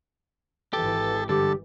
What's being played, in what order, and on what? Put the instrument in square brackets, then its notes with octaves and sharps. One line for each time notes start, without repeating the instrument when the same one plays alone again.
[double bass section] G#1 E3 [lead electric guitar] G4 [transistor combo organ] A4
[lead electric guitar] G2 D3 [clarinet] G4 [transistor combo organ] A4